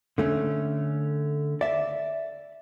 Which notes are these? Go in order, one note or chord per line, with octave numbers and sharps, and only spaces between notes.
D3 A3 C#4
D5 E5